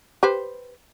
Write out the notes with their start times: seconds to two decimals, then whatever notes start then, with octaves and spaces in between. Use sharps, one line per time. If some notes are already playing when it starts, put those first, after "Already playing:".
0.23 G4 B4 C5